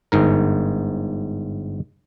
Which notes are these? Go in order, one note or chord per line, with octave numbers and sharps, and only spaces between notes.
G1 G#2 A#4